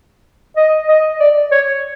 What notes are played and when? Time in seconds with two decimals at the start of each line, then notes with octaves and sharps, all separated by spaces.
0.57 D#5
0.88 D#5
1.20 D5
1.51 C#5